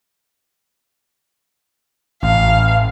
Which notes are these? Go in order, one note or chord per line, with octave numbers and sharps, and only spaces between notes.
A1 F5